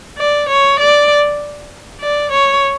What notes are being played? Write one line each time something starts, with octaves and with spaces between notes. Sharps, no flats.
D5
C#5
D5
D5
C#5